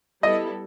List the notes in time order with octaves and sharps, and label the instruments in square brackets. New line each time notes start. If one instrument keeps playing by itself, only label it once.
[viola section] G3 B3 E4 A4 [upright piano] D#5